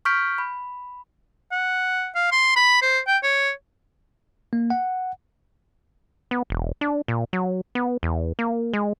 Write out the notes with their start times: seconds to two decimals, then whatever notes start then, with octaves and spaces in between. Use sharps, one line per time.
0.05 C#6 F6 G6 B6 D7
0.38 B5
1.52 F#5
2.15 F5
2.31 C6
2.56 B5
2.82 C5
3.07 G5
3.23 C#5
4.53 A#3
4.70 F#5
6.31 B3
6.50 E1
6.81 D4
7.08 A#2
7.33 F#3
7.75 B3
8.03 E2
8.39 A#3
8.73 G#3